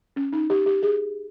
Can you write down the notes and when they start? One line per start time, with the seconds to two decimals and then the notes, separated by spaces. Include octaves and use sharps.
0.16 C#4
0.33 D#4
0.50 G4
0.66 G4
0.83 G#4